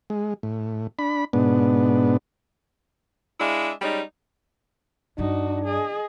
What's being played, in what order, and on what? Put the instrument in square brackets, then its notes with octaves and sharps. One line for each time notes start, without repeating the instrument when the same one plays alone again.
[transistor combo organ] G#3
A2
D4 B5
G#2 B2 B3 D4
[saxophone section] G#3 D4 E4 E5 F5
G3 G#3 C#4 D#4 D5
[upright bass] G2 G3 [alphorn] D4 [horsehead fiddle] D#4 F#4
[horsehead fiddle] G#4 D#5